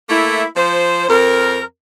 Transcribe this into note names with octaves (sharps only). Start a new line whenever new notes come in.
A3 A#3 E4
F3 C5
F2 C4 A#4